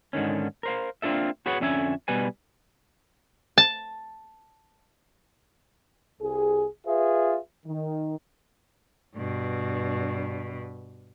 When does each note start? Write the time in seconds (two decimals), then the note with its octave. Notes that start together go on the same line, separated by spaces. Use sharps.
0.13 G#2 D3 D#3 C#4
0.63 A#4 C5 F5
1.02 A#3 C4 D4 F4 A4 E5
1.46 F#4 G#4 B4 C#5 F#5
1.60 F2 D3 C#4 E5 G#5
2.08 B2 G3 B4 G#5
3.58 A5
6.21 C2 G#4
6.86 F4 G#4 B4 E5
7.66 D#3
9.16 G2 B2